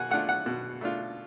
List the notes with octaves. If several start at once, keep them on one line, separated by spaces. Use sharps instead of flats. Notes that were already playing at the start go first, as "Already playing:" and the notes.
Already playing: B2 F#5 G#5
A3 D4 F4 F#5
F#5
B2
A3 D4 F4